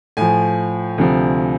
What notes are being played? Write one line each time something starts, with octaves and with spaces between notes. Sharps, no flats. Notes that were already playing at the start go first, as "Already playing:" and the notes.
A2 F3 G#5
D2 C3 F3